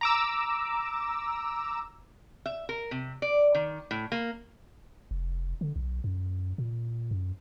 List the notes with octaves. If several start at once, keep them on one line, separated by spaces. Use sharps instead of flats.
A#5 D6 E6
E5
A#4
C3
D5
D#3
A2
A#3
F1
D3
B1
F#2
A#2
F#2